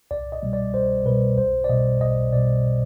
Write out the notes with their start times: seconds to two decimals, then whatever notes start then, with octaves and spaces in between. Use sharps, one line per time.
0.11 C2 D5
0.32 D#5
0.42 B2 G3
0.53 D5
0.74 C2 C5
1.06 B2 G3 B4
1.37 B1 C5
1.64 D5
1.69 B2 G3 D#5
2.01 B1 D#5
2.33 B2 G3 D5